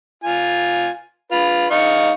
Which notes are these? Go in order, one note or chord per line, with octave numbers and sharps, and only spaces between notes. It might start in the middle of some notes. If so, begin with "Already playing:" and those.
F4 G#5
F4 B4
D#4 F5 C#6